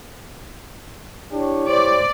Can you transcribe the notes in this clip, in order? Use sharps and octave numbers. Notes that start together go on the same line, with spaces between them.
D4 E4 G4 C#5
C5 D5